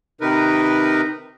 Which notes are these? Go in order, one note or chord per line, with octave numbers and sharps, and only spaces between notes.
C3 D#3 D#4 A#4 B4